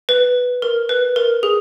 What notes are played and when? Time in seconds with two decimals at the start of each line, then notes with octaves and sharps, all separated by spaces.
0.09 B4
0.62 A#4
0.89 B4
1.16 A#4
1.43 G#4